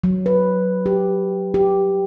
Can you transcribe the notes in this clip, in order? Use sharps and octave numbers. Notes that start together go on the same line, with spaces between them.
F#3
B4
G4
G4